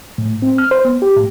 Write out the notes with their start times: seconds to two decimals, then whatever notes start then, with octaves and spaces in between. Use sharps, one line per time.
0.18 A2
0.42 C4
0.58 F6
0.71 C5
0.85 B3
1.02 G4
1.17 A2